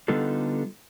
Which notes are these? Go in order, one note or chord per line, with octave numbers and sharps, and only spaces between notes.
D3 G3 B3 D#4 F4 A4